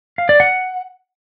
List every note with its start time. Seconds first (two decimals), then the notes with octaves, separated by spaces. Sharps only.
0.18 F5
0.29 D5
0.40 F#5